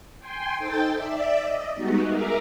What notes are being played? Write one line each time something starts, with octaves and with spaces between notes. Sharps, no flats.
G5 G#5 C6
D#4 A4 C5 G5 A6
D5 E5
D#5
G3 G#3 B3 D#4 F#4
G#4 A#4 E5 A#5 D6